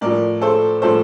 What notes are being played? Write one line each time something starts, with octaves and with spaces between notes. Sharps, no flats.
A2 F3 A#4 D5
A4 C5
A2 F3 A4 C5